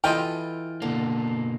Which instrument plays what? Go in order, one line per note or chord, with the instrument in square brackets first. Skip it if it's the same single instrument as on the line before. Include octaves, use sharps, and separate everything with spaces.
[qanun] E3 A4 B5 [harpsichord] F4 D#5 F5 [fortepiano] G5
[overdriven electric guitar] B2 A#3 [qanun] D3